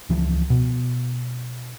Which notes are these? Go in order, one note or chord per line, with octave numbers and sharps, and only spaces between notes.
C#2 E3 F3
B2